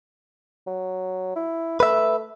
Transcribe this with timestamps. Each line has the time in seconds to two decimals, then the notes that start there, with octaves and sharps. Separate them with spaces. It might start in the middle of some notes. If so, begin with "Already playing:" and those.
0.67 F#3
1.36 E4
1.80 A3 B4 E5